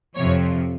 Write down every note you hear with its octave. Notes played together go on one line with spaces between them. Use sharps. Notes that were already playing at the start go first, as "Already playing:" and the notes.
F2 C3 F3 C#5